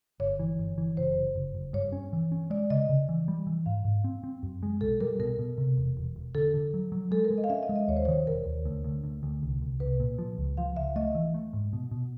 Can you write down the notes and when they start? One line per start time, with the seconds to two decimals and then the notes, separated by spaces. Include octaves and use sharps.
0.20 G1 C#5
0.39 E3
0.59 G1
0.78 E3
0.97 F#1 C5
1.17 F#1
1.36 F#1
1.55 F#1
1.73 G2 C#5
1.92 C#4
2.13 E3
2.32 C#4
2.50 G#3 D5
2.70 C#3 D#5
2.89 C#3
3.09 E3
3.28 G3
3.47 E3
3.66 G#2 F5
3.85 G#2
4.04 C4
4.24 C4
4.43 F#2
4.63 G#3
4.81 B1 A4
5.01 G3 A#4
5.19 B2 A#4
5.39 B2
5.58 C3
5.78 E1
5.97 E1
6.16 E1
6.35 D3 A4
6.54 D3
6.74 F#3
6.92 F#3
7.11 G#3 A4
7.24 A#4
7.30 G#3
7.38 D#5
7.44 F5
7.50 C#4 E5
7.63 D#5
7.69 G#3
7.76 D#5
7.88 D#2 C#5
7.96 C5
8.05 D#3 C#5
8.27 E1 A#4
8.46 D#2
8.65 D2
8.84 D2
9.04 D2
9.23 D2
9.43 C2
9.62 C2
9.80 C2 B4
10.00 A#2
10.18 F3
10.38 C#2
10.57 F3 F5
10.76 C#2 E5
10.96 A3 D#5
11.15 E3
11.34 A3
11.53 G#2
11.73 B2
11.91 B2